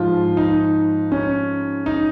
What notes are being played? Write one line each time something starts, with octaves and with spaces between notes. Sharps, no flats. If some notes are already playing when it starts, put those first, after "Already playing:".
Already playing: G#2 F3 F4
D#4
C#4
D#4